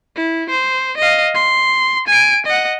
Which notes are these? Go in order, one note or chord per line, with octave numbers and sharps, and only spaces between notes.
E4
C5
D#5 F5
C6
G#5 D7
D#5 F#5